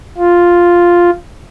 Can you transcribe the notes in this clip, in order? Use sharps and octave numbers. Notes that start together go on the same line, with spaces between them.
F4